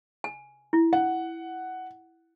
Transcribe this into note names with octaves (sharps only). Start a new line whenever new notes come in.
G#5
E4
F#5